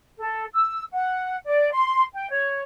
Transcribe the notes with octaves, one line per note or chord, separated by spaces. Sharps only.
A4
E6
F#5
D5
C6
G5
C#5